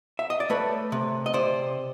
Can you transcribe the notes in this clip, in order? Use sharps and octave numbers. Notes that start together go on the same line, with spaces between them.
E5
D#5
D5
A3 B4 C#5
C3
D#5
C3 C5 D5